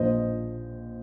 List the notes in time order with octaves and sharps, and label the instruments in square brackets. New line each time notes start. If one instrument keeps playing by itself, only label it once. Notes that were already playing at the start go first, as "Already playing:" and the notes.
Already playing: [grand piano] A#1 A#2 F3 C5 D#5